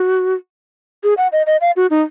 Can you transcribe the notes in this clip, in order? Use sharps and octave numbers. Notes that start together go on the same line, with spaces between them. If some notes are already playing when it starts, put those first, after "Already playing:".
Already playing: F#4
G#4
F#5
D#5
D#5
F5
F#4
D#4